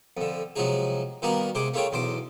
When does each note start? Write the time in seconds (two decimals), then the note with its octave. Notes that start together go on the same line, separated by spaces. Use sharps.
0.17 F2 D3
0.56 C3 F3 F#3 G#3 D#4 G#4
1.22 D#3 G3 A#3 B3 F#4 A#4
1.55 C3 G#3 G#4 C5 D6
1.74 A3 A#3 F4 G#4 C#5 G5
1.92 B1 E2 C5 C6 D6